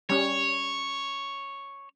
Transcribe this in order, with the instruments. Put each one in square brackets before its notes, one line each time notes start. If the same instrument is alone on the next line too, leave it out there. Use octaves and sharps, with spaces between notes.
[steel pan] G3 C#4 [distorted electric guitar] C#5